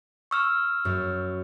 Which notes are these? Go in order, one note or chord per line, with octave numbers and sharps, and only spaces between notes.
C#6 E6 F6
F#2